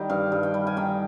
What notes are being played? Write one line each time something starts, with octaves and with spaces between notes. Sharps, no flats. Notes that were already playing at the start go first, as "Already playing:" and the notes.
Already playing: D#3 G3 G4
G2 F5
G2
G5
G3
G#5
D#3 G5